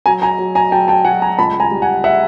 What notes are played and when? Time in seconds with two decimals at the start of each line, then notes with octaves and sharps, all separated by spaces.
0.06 F#3 G#5 A#5
0.22 G#5 A#5
0.39 F#3
0.55 G#5 A#5
0.72 F#3 G5 A5
0.88 G5 A5
1.05 F#3 F#5 G#5
1.22 G#5 A#5
1.39 C#2 A5 B5
1.60 G#5 A#5
1.71 G3
1.82 F#5 G#5
2.04 E5 F#5